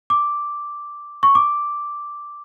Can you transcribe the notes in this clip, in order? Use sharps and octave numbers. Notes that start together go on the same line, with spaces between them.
D6
C#6
D6